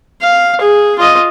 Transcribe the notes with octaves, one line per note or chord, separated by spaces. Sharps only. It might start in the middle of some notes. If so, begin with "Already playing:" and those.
F5
G#4
F4 D#5